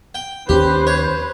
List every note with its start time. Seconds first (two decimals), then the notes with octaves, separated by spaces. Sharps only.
0.15 G5
0.49 D#2 C4 C#4 G4 B4 C5
0.87 C#5